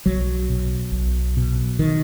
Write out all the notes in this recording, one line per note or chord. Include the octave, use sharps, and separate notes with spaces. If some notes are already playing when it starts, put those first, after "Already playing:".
B1 F#3
B2
B1
B2
D#3